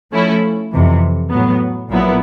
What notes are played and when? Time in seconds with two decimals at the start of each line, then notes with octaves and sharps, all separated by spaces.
0.12 F3 A3 C#4 E4 A4
0.72 F2 C3 E3
1.30 A2 F#3 B3
1.90 A#1 A#2 F#3 B3 E4